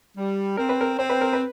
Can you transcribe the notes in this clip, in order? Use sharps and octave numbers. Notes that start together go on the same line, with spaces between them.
G3
C4 A#4
B4
A#4
C4 C5
B4
A#4
B4